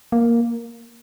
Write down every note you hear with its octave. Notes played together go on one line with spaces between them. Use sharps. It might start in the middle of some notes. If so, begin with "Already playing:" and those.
A#3